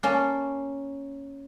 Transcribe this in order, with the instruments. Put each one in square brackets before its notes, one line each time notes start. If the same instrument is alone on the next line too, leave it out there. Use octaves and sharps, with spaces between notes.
[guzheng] A#3 C#4 A5